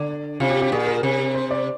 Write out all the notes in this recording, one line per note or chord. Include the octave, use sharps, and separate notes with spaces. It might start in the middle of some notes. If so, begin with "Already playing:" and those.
Already playing: D3 D5
C3 F4
G4
G4
A#2 G#4
A#4
C3
C5
D5